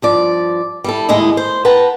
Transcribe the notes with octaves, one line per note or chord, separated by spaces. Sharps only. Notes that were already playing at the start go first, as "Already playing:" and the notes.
G2 F3 D5
G3 E4 A4
D#2 A2 G#3 E4 D#5
C5
B4 F#5 G5 A5 A#5